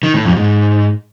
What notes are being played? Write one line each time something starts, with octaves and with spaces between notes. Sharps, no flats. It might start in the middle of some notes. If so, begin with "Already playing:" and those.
D#3
A2
F2
G#2